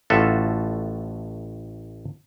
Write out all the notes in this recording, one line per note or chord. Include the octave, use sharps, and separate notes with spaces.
A1 A2 F4 F#4 A4 E5